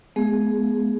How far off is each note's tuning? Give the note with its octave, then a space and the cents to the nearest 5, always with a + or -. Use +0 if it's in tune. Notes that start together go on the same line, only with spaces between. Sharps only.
G#3 +40 B3 +0 G#4 +0